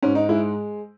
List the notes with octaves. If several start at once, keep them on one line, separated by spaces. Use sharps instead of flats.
G#2 C#4
D#4
G#3 E4